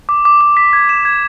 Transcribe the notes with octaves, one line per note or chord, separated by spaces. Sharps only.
D6
D6
D6
B6
G#6
E7
G#6